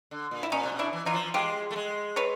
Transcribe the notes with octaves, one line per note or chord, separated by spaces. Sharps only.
D3
A#2
E4
A#2 C#4 D#4
C3
B2
D4 E4
E3
E3 D#4 F4
F3
G#3 F4 G4
A3
G#3
B4 C#5